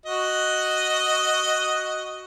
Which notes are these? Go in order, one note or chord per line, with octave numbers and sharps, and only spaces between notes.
F#4 D#5